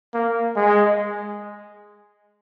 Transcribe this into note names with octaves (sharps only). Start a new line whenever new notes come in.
A#3
G#3